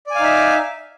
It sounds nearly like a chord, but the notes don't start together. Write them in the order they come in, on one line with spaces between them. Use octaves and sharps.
D5 G#5 F5 D#4 E5